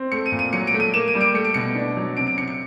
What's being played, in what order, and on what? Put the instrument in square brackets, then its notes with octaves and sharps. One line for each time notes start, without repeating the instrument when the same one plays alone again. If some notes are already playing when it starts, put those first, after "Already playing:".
Already playing: [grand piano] C4
A3 C#7
D#7
A#2
D#7
F#3 C#7
D7
A3
D#7
A#3 E7
D#7
G3
D7
A3 C#7
D7
B2 C#7
D4
F#3
C3 D7
D7
C3 C#7
C#7